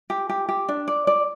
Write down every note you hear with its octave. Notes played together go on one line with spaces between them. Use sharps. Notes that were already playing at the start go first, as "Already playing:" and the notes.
G4
G4
G4
D4
D5
D5